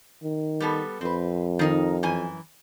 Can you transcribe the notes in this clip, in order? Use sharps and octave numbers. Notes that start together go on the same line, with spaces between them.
D#3
G3 B3 A4
F2 C4 B4
D#3 D#4 A#4
F#2 E3 G#5